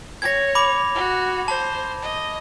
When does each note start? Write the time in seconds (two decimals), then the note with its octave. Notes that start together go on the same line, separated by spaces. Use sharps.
0.22 C#5 G#6 A#6
0.55 B5 D6 F7
0.95 F#4
1.48 C5 A5
2.02 D#5